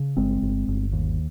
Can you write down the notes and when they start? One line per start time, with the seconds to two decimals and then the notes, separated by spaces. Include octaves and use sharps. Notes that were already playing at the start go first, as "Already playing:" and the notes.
Already playing: C#3
0.17 G1 G#3 C4
0.42 G1
0.68 G1
0.92 D#2